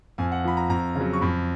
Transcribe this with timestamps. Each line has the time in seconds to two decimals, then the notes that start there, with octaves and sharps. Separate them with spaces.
0.18 F2 G#5
0.32 F#5
0.44 F3 B5
0.57 A#5
0.69 F2 A#5
0.95 C#3 F#3
1.13 C#6
1.21 F2 B5